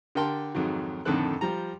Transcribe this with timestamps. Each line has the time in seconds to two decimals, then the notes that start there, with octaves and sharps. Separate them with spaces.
0.15 D3 G4 A#4 G5 A5 C6
0.55 F2 G#2 D#3 F#3
1.05 F2 A2 D3 D#3 A4 F#6
1.41 F3 G3 A#5